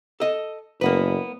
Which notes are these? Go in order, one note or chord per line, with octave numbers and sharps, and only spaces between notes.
A4 D#5
F#1 A#3 B3 B4